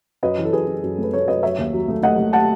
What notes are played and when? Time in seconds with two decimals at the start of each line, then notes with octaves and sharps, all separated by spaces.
0.23 F#2 B4 D#5
0.38 E3
0.45 A4
0.53 F#2 G#4 B4
0.67 F#2
0.83 F#2
0.99 A3 B4
1.12 A3 A4 C#5
1.28 F#2 B4 D#5
1.43 F#3 C#5 E5
1.58 D#2
1.73 F#3
1.88 A3
2.03 A3 D#5 F#5
2.18 A3
2.33 F#5 A5